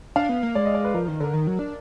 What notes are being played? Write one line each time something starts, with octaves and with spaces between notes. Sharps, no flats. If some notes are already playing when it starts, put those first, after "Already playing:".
D4 F5
B3
A#3
G#3 D5
D#5
D5
B4
F3 A#4
D#3 A#4
D3 A#4
D#3
F#3
D4